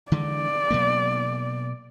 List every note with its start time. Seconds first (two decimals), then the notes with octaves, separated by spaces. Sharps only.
0.12 D3 E3 G#3 D5
0.71 B2 F#3 A#3